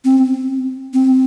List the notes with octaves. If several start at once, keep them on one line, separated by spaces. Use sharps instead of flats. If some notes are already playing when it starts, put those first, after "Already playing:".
C4
C4